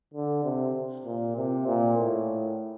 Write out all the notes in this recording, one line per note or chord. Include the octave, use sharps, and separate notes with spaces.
D3
C3
A#2
C3
A#2
A2